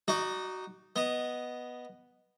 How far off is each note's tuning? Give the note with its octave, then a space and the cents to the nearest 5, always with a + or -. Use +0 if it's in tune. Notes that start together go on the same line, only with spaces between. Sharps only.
D#4 +0 F#4 +15 D5 +35
B3 +0 D#5 +0